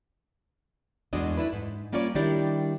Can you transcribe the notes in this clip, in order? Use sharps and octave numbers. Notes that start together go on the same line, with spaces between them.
E2 G#3 A3 D4 F#4 D#5
D4 E4 B4
G#2
G3 A#3 C#4 F4 C#5 D5
D#3 G3 D4 E4 G4 D5